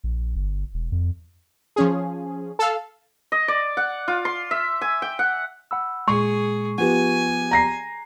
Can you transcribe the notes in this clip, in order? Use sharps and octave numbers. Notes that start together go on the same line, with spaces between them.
A#1
G1
E1
F2
F3 C#4 G#4
A4 F5
D#5
D5
F#5
F4
C6
E5
G#5
G5
F#5
F#5 B5 E6
A#2 G#3 G#4 C#6
F3 B3 G4 F#5 G#5
A#5 A#6 C7